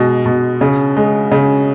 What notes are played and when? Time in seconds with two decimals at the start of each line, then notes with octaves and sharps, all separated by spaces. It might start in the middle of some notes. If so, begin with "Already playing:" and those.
Already playing: B2 G#3
0.26 B2
0.61 C#3
0.97 G#3
1.31 C#3